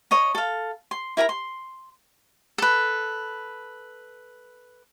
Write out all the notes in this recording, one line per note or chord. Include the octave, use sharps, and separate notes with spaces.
C#5 D#5 A#5
A4 F5
C6
E4 A#4 A#5 B5
C6
A4 B4